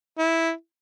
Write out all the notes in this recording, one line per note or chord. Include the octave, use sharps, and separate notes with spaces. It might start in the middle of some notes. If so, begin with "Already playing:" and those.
E4